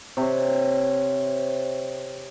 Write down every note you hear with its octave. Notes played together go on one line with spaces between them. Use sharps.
C3 C#5